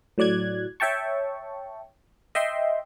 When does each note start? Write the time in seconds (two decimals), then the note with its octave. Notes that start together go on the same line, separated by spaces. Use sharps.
0.18 A2 F#3 D5 F#6 G#6
0.80 C#5 E5 G5 A5 C#6
2.35 D#5 E5 G5 C6